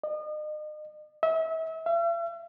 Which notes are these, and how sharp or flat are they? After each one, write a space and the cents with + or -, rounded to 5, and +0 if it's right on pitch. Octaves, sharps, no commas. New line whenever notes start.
D#5 -40
E5 -35
E5 +45